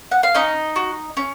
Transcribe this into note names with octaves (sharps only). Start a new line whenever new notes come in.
F#5
F5
C#4 D#4 D#5
F#4
C#4